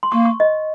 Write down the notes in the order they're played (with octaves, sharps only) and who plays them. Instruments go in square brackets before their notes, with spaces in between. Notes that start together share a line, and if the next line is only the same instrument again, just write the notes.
[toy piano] C6
[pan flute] A#3 [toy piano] C#6
[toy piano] C#6
D#5